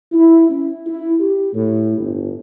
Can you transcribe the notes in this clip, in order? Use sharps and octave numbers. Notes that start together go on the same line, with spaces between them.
E4
C#4
E4
G4
A2
G1